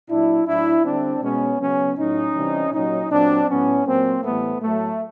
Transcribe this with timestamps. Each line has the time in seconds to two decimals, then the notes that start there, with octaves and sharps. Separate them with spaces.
0.09 A#2 F#3 D4 E4
0.47 A2 F#3 D4 E4
0.84 D3 G3 C4 D4
1.22 B2 G#3 B3 C#4
1.60 C#3 F#3 B3 C#4
1.97 A2 F#3 C#4 D#4
2.35 C3 E3 G3
2.73 A#2 F#3 C#4 D#4
3.10 A#2 F#3 C4 D4
3.48 A2 F#3 B3 C#4
3.86 A#2 F#3 A#3 C4
4.23 A2 E3 G3 A3 B3
4.61 A2 F#3 A3